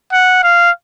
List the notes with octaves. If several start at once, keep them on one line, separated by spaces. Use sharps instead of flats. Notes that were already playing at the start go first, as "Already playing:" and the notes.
F#5
F5